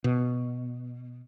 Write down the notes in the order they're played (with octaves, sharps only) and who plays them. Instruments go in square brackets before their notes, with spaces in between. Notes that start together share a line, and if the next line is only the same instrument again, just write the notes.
[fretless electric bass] B2